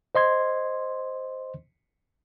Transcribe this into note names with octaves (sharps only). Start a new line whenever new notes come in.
C5 D#5 C6 G#6